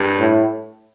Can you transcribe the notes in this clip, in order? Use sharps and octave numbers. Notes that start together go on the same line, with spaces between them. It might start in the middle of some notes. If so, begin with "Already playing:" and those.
Already playing: G2
A2